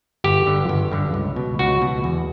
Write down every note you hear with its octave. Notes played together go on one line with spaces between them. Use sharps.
G1 G4
G2 D3
G1
G2 D3
C#2
B2
C#2 F#4
B2
E2